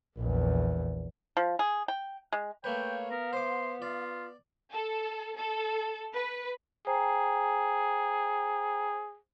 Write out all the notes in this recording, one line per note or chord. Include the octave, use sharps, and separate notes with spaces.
A#1 E2
F3
G#4
G5
G#3
A3 A#3 B4 C#5 F5 G5
B3 A#4
C5 C6 D6
F4 D5
A4
A4
B4
G#4 C5 G5 A#5